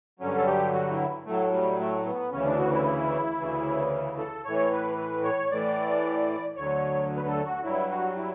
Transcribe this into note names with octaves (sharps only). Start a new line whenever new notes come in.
G2 D3 F#3 C#4
A4
G4
F#4
E4
A2 F#3 A3
G3
A3
B3
D2 C#3 E3 C#4
D4
F#4
E4
E4
D2 C#3 E3
A4
A2 E3 C#5
B4
B4
C#5
A2 E3 D5
D2 D3 F#3 C#5
B4
A4
F#4
G2 F#3 E4
F#4
E4